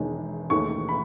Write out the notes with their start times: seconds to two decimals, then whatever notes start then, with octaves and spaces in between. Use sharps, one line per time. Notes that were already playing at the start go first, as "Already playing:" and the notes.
Already playing: E1 E2 D#3 G#3
0.50 E1 D#2 D#3 A3 C#6
0.89 B5